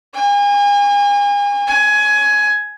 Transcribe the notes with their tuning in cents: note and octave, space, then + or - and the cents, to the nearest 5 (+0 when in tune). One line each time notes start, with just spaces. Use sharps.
G#5 -35
G#5 +15